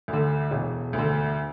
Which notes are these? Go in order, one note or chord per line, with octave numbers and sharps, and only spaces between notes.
D2 D3
E1
D2
D3